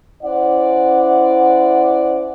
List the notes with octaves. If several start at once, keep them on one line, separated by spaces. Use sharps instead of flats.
C#4 E4 C5 D5 F#5